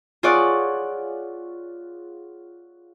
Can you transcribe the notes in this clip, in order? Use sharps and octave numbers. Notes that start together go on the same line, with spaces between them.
F4 G#4 C#5 D5 F#5